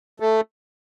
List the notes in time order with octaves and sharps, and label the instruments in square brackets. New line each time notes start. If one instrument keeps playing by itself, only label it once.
[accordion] A3